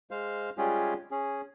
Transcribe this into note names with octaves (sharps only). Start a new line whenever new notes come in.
G#3 C5 F5
G3 G#3 C#4 F4 G4 G#4
C#4 G#4